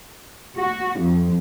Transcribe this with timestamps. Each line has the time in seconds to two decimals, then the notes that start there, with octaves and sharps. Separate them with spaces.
0.58 F#4
0.99 F2